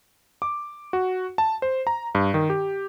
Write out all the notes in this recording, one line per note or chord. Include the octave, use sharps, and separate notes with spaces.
D6
F#4
A5
C5
A#5
G2
D#3
G4